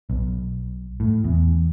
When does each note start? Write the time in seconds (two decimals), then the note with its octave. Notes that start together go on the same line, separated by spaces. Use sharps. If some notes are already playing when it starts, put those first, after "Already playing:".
0.10 B1
1.00 A2
1.24 E2